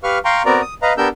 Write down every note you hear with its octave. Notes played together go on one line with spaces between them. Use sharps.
G4 B4 F5 C#6 F6
F5 G5 A#5 C6 C#6
B3 C4 F#4 A#4 D5 A#5
D#6
B4 D#5 F5 A#5
B3 D4 G4 A#4 E6 G6